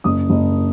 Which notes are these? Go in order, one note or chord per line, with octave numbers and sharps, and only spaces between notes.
F#1 D#6
F#1